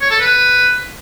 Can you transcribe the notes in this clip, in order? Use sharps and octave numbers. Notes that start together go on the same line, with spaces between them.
C#5
A4
B4